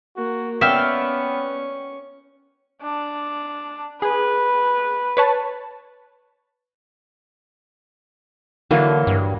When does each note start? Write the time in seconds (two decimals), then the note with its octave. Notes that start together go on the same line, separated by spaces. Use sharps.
0.17 A#3 F#4
0.61 B3 C#4 D5 E5 F5 G5 C#6
2.82 D4
4.02 G#4 B4
5.17 B4 C#5 A5
8.71 D3 E3 F#3 A#3
9.07 G2